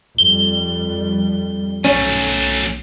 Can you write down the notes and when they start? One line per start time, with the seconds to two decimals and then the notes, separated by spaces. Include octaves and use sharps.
0.18 F2 G3 G7
1.85 B1 F#3 A3 C#4